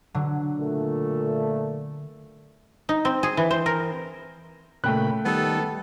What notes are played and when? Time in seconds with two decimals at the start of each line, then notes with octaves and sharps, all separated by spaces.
0.14 D3 F#3
0.58 A#2 A3
2.89 D#4
3.05 C4
3.23 G#4
3.37 E3
3.51 C5
3.66 A#4
4.84 A#2 C#3 A3 G5 B5 F#6
5.26 D#3 G3 B3 A4